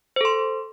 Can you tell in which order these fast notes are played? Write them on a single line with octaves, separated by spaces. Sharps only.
C5 A4 C6